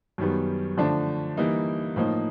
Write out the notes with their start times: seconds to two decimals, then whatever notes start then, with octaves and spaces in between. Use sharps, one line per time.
0.18 F#2 D#3 G3 B3
0.78 D3 F3 A3 D4
1.37 E3 G3 A#3 D#4
1.96 A2 F3 A#3 D#4